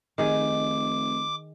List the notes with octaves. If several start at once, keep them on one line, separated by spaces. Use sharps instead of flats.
F1 D#3 G#4 D6